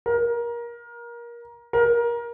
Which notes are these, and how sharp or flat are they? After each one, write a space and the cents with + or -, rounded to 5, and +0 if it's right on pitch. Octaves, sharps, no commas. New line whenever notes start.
A#4 +25
A#4 +25